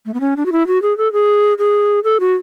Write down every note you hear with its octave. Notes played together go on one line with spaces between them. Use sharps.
A3
B3
C#4
D4
F#4
E4
F#4
G#4
A4
G#4
G#4
A4
F#4